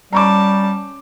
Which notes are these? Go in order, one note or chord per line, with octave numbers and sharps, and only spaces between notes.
G3 C#4 A5 A#5 C#6 D6